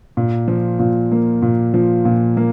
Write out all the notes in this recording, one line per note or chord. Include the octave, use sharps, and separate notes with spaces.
A#2
F3
A#2
A#3
A#2
F3
A#2
A#3